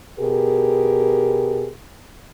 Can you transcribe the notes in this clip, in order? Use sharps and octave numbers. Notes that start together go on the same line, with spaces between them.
B2 G4 G#4 A#4